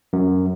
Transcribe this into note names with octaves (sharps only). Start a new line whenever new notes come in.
F#2